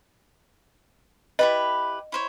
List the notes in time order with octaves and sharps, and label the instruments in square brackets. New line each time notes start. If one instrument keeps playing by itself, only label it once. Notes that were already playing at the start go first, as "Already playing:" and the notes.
[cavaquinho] E4 G4 B4 [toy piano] D#5
[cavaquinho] E4 C5 C#5